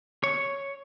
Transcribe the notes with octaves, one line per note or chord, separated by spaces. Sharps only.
C#5